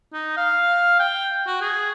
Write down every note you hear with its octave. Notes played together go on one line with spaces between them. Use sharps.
D#4
F5
G5
F#4
G#4